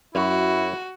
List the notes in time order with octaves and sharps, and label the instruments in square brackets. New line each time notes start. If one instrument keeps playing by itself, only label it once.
[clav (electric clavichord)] F#2 [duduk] E4 [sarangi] F#4